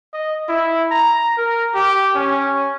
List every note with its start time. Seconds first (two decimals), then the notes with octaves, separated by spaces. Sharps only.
0.13 D#5
0.48 E4
0.91 A#5
1.37 A#4
1.74 G4
2.15 C#4